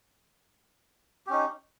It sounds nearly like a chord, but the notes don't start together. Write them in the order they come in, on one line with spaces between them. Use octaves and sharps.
G4 C#4 D#4